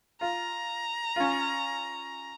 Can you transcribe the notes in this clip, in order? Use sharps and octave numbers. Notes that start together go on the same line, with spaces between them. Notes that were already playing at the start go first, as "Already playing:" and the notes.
F4 A#5
C#4 F4